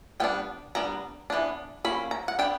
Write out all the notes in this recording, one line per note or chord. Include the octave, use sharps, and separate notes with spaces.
G3 B3 D4 G5
G3 B3 D4 A#5
E3 B3 D4
F#3 A#3 C#4 B5
A#5
F#5
B3 D4 G5